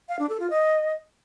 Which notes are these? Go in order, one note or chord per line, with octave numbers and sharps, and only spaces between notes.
F5
D4
A4
F4
D#5